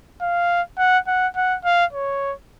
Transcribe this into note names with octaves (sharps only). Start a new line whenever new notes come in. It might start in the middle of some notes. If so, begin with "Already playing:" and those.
F5
F#5
F#5
F#5
F5
C#5